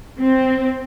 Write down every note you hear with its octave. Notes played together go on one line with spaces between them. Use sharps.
C4